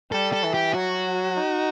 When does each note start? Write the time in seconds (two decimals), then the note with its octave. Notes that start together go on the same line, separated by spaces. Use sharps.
0.12 G3 A4
0.33 A4
0.44 E3
0.54 G4
0.74 F#3 F#4
1.37 D#4